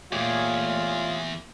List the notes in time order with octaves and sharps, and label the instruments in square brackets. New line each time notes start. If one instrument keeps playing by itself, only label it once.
[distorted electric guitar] E2 [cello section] A#2 A3 [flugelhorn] F4 [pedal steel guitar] G4 G#4 C#5